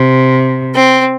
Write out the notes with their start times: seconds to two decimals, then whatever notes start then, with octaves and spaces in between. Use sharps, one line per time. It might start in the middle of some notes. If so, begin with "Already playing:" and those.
Already playing: C3
0.75 C4